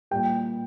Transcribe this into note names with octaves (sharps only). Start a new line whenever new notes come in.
A#2 G3 G5